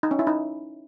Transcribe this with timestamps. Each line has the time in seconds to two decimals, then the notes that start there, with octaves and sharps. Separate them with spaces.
0.03 D#4
0.11 C#4
0.19 E4
0.27 D#4